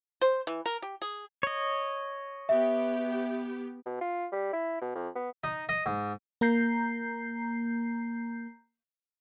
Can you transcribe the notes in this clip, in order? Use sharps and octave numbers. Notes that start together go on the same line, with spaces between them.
C5
E3
A#4
G4
G#4
C#5 D#5
B3 G4 E5
B2
F4
G3
E4
B2
F2
B3
D#4
D#5
G#2
A#3 A#5 G6 C7